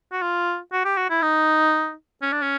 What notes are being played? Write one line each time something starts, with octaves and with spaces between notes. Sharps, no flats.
F#4
F4
F#4
G4
F#4
E4
D#4
C#4
D4
C#4